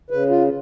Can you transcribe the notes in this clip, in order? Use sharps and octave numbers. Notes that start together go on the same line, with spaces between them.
C#3 B4
F4